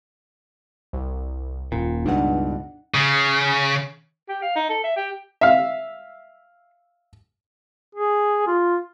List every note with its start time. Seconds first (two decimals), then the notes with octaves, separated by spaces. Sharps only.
0.93 C2
1.72 D#1 A#2
2.06 C#2 G2 B2 D4 D#4 F#5
2.94 C#3
4.29 G4
4.42 F5
4.56 D#4
4.69 A4
4.84 E5
4.96 G4
5.41 E5 F5
7.95 G#4
8.47 F4